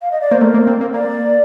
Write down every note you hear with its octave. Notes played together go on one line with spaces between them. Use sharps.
F5
D#5
D5
A#3 C5
A3 A#4
A#3
C4
A#3
A#3 D5